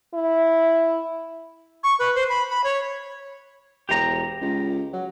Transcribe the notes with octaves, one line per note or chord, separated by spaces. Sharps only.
E4
C#6
B4
C5
B5
B5
C#5
E1 G4 A#5
C#2
F#3